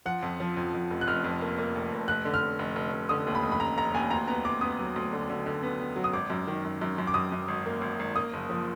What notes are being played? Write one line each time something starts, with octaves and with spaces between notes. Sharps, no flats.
F3 F#5
F2
F3
F2
F2
F1
F#6
F1 F6
F2
A#3
A#3
F1
F1
F1 F#6
D3
F6
F1
F1
F1
F1
D3 D#6
D#2
B5
F1
B5
F1 A#5
F1 A#5
D#2 G#5
D2 A#5
B3 A#5
D2 D6
B3 D#6
F#3
D2
D3
D3
D3
B3
B3
F#3
D#6
G#1 D6
F#2
D#3
F#2
F#2
F#2
D6
F#2 D#6
F#2
G#1
A#3
G#1
G#1
A#3 D#6
F#1
F3